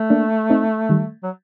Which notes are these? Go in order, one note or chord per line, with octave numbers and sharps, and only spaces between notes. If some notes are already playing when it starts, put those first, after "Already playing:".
Already playing: A3
A#3 D4
C4 D#4
D#3 G3
F#3